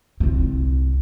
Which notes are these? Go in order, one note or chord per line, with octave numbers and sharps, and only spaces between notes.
C2 C4